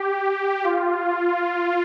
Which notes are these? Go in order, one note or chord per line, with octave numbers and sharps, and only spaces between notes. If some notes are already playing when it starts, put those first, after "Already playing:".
Already playing: G4
F4